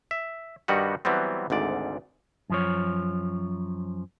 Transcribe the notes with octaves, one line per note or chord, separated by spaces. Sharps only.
E5
G2 D#3 G3 D#4 F#4 F#5
E3 F#3 G3 B3 C4
G#1 D2 G#2 D5
F#2 F3 C#5